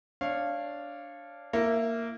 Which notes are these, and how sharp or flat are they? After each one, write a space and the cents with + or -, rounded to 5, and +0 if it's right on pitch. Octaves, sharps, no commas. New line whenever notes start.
D4 -10 C#5 -25 F5 -10
A#3 -10 E4 +10